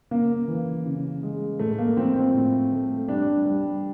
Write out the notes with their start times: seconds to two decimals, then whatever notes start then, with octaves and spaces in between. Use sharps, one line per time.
0.11 C#3 A#3
0.48 E3
0.86 C#3
1.23 G#3
1.60 A2 A3
1.78 A#3
1.97 F3 C4
2.16 C4
2.34 A2
2.72 A3
3.08 G3 D4
3.45 G3